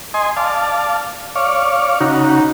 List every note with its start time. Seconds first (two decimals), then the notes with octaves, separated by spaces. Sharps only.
0.14 D#5 G#5 C6
0.36 D5 F5 A5
1.35 C#5 D5 F5
2.00 C#3 D#4 F#4